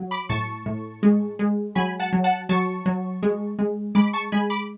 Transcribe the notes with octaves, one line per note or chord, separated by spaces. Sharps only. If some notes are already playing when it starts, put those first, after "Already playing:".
Already playing: F#3
B5 D6
A2 A5 C#6
A2
G#3
G#3
F#3 G#5 B5
F#5 A5
F#3
F#5 A5
F#3 A5 C#6
F#3
G#3
G#3
G#3 B5 D6
A5 C#6
G#3 G#5 B5
B5 D6